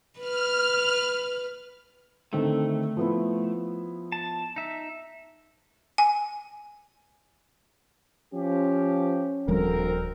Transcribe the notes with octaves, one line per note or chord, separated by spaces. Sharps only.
B4 F6
D3 D#3 A3 C4
F3 B3 E4
A5
D#4 E5
G#5
F3 C#4 G4
D#1 D2 F3 G3 C4 A#4